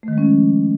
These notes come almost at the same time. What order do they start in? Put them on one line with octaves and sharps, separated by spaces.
A3 D#3 G#3 C#4 F3